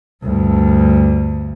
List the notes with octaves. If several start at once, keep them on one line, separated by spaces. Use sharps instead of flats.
D2 G2